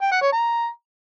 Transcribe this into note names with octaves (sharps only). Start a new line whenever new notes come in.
G5
F#5
C#5
A#5